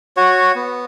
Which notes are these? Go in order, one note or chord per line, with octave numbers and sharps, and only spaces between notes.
F#4 C#5
B3